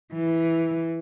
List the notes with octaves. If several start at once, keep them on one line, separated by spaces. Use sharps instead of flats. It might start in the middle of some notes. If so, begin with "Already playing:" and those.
E3